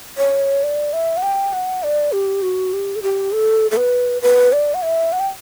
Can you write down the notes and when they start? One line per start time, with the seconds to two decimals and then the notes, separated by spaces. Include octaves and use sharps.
0.18 C#5
0.63 D5
0.93 E5
1.17 F#5
1.23 G5
1.53 F#5
1.83 D5
2.12 G4
2.42 F#4
2.73 G4
2.96 A4
3.03 G4
3.32 A4
3.71 A4
3.77 B4
4.22 B4
4.52 D5
4.74 F#5
4.82 E5
5.12 F#5
5.20 G5